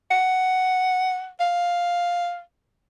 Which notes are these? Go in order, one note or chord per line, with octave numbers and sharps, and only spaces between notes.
F#5
F5